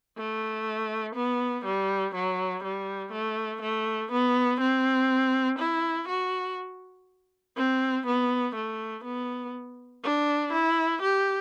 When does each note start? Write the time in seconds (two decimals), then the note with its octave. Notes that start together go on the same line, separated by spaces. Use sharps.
0.17 A3
1.15 B3
1.65 G3
2.15 F#3
2.64 G3
3.12 A3
3.62 A3
4.12 B3
4.60 C4
5.59 E4
6.08 F#4
7.57 C4
8.06 B3
8.55 A3
9.04 B3
10.04 D4
10.53 E4
11.02 G4